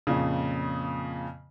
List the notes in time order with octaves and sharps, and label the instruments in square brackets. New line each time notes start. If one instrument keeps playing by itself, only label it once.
[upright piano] F2 A#2 C#3